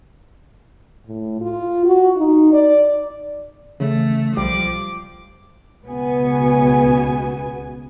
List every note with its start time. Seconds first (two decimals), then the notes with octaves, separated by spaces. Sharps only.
1.07 A2
1.41 F4
1.85 F#4
2.17 D#4
2.53 D5
3.80 C#3 E3 A3
4.37 B1 F3 G3 D6
5.87 C#2 B2 B3 G#5